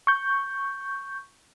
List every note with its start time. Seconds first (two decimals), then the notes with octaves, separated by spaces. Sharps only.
0.07 C#6 G6